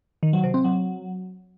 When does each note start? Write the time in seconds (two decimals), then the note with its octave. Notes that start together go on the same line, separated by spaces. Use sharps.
0.23 D#3
0.33 F#3
0.44 C3
0.54 C4
0.64 F#3